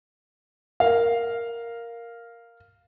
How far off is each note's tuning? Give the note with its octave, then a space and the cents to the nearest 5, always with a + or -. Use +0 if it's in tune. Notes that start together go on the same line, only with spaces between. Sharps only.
A#4 +0 F5 +0